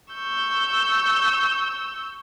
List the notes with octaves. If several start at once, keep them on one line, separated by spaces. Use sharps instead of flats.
C#6 E6 G6